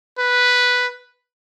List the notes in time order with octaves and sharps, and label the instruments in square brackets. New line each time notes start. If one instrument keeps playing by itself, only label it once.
[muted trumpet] B4